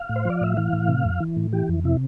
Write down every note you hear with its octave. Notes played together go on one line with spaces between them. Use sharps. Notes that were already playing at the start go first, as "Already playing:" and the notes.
Already playing: F5
A2
C5
F3 D5
A2 E5
E3 F5
A2
C3
F2
E3
A2
E3 G4
F2
C3 E4